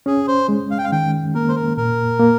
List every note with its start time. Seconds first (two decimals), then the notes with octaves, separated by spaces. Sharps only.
0.06 C#4 G#4
0.28 C5
0.49 G#3
0.71 F5
0.78 G5
0.84 F5
0.92 D#3 G5
1.35 A#3 A#4
1.49 C5
1.56 A#4
1.77 A#2 A#4
2.20 A#3